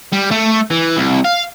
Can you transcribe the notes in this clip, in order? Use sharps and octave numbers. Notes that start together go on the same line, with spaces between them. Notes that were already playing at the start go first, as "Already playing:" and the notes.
G3
A3
E3
C2
F5